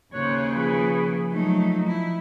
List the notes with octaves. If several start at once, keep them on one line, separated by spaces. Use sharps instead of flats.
D#2 C#3 C5 C#5 F#6
F3 G#4 B4
F#3 A3 D#4
E4